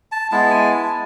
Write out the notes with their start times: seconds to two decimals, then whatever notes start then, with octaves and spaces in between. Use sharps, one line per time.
0.12 A5
0.31 G#3 B3 E4 A5
0.51 G#5
0.71 A5